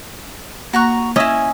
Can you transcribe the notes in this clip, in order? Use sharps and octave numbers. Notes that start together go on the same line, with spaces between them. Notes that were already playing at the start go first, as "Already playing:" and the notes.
A#3 F#4 A#5 C#6 F#6
C#4 D#4 E4 D#5 E5